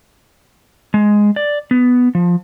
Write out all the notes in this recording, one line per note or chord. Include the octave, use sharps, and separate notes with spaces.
G#3
D5
B3
F3